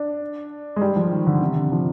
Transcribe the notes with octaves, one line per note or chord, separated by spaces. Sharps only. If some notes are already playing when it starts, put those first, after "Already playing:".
Already playing: D4
G#3
G3
F3
D#3
D3
C3
D3
F3